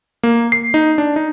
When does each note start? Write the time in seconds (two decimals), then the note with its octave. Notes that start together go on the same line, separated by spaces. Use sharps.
0.23 A#3
0.52 C7
0.74 D#4
0.98 D4
1.16 D#4